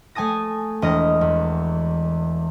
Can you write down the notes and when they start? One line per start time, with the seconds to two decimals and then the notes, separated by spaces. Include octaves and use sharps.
0.15 A3 G#5 A5 D#6 A#6
0.82 E1 D#5 F6 A#6
1.21 E2